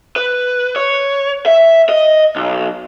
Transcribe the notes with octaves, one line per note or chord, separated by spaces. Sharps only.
B4
C#5
E5
D#5
B1